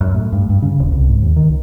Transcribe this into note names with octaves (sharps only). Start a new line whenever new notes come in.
F#2
A2
G2
G2
C#3
D#1
C2
G#2
D#2
D#3
C#2